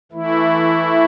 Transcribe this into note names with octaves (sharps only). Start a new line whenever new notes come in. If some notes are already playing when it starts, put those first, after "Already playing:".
E3 A3 E4